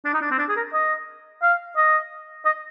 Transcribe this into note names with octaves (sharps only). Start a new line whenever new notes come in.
D4
D#4
D4
C4
D4
G#4
A#4
D#5
F5
D#5
D#5